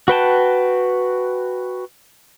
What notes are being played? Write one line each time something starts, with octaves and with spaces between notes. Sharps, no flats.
F#4 B4 G5 A5